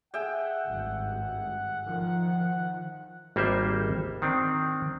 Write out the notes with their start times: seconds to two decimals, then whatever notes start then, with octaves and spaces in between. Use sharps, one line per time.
0.14 G#4 E5 F#5 G5
0.65 G#1 G2
1.85 D#3 F3
3.36 G#1 G3 A#3 D#4 C5 E5
4.22 D#3 C4 D4